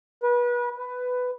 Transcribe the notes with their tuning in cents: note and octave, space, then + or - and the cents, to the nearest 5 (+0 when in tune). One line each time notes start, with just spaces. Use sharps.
B4 -30
B4 +10